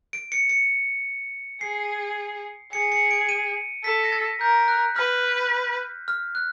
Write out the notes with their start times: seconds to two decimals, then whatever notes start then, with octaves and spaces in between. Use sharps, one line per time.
0.13 D7
0.32 C#7
0.49 C#7
1.61 G#4 C7
2.73 G#4 C#7
2.92 C#7
3.11 D7
3.29 D#7
3.84 A4 B6
4.04 A#6
4.12 A6
4.40 A#4 G6
4.68 F#6
4.96 B4 F6
6.08 F6
6.35 F#6